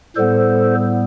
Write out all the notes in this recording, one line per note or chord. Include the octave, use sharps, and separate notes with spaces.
A2 G3 B3 A4 C5